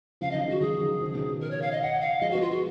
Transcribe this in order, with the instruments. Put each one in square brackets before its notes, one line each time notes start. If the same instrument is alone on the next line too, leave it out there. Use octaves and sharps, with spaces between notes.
[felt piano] C#3 F3 [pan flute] F5
[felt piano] D#3 F#3 [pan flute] D#5
[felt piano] F3 G#3 [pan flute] F#4
[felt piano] D#3 F#3 [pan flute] G#4
[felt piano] D#3 F#3
C#3 F3
B2 D#3
[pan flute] A#4
C#5
F5
D#5
F#5
F5
[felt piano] F3 G#3 [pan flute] D#5
[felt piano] G#3 B3 [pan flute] F#4
[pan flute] F4
F#4